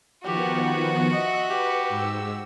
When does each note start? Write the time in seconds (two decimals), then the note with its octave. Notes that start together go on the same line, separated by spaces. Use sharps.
0.24 D#3 F3 B3 F#4 G4 F#5
1.12 D#5 E5
1.49 G4 B4
1.88 G#2 E6